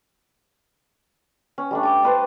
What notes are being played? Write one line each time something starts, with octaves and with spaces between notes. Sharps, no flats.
C#4
G3 A3 D4
A5 D6
D4 B4 C5